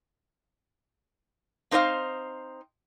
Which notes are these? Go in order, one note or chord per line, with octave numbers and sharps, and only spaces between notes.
C4 D#4 C5 D5 F5